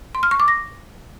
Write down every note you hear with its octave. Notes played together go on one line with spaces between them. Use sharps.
C6
F6
C#6
D6
A#6